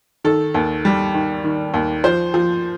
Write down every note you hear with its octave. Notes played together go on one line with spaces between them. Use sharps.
D#3 A4
D#2
G3
D#3
D#3
D#2
F3 C5
F3